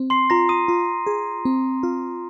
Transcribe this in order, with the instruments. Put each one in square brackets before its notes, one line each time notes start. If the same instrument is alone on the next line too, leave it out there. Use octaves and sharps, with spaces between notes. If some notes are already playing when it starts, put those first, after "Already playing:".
Already playing: [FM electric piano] C4
[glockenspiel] C6 C7
[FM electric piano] F4 [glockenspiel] A#5 A#6
[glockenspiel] D#6 D#7
[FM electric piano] F4
G#4
C4
F4